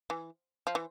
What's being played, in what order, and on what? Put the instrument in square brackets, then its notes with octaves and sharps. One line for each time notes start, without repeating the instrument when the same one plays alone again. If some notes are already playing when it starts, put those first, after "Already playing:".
[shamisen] E3
F3
E3